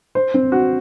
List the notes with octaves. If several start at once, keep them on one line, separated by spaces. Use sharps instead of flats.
C5
C4
F#4